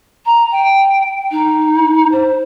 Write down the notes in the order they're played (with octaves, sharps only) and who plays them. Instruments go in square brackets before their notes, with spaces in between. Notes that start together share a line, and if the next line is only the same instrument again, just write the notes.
[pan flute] A#5
G5
D#4
C5